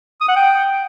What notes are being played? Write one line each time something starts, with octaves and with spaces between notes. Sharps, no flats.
D#6
F#5
G5